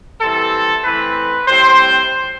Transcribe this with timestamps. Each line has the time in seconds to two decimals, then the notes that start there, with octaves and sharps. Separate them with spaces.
0.21 E3 G3 C4 A4
0.85 E3 A3 C4 B4
1.48 A2 G3 C4 C5